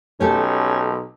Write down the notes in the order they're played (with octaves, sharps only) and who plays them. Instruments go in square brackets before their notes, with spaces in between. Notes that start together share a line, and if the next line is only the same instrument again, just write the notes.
[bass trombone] B1 [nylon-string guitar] A3 G4 A4 [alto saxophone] C#4